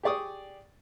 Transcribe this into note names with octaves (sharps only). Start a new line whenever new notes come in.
G4 G#4 D5 C#6 D#6